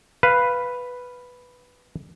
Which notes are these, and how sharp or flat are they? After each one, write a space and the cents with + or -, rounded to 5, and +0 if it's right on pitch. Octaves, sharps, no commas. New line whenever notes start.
B4 +0 F5 +0